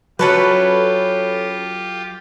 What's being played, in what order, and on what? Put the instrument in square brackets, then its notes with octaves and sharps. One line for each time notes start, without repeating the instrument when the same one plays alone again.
[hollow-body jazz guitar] F#3 [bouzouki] C#4 A4 B4 [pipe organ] F4 G4